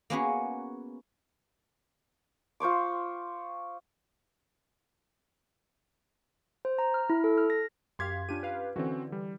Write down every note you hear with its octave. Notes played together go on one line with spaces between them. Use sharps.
A#3 B3 C#4 F#4 G#4 B4
F4 C5 C#6 D6
C5
A#5
F6
E4
A4
F6
A#6
F#2 G4 F5 C6 G#6 B6
C#4 D4 F4 G4 D#7
B4 F5
D3 E3 C4 C#4 F#4
G3